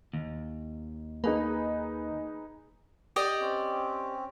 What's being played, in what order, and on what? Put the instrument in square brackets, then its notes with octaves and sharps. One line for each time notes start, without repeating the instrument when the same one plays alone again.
[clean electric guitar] D#2
[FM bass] A#3 [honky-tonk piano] D#4 G#4 B4
[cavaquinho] G4 D5 D#5
[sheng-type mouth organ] C4 C#4